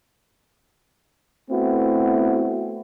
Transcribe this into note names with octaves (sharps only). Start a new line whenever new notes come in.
A3 B3 C4 E4 F#4